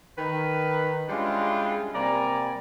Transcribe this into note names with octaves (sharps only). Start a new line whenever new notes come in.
D#3 B4
G3 G#3 C#4 D4 E4 F4
C3 G3 A#3 D5 G#5 A#5